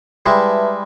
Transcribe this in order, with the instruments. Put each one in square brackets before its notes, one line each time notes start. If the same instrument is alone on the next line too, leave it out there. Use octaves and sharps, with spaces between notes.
[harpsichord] G3 G#3 E4 [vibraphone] B4 E5 A5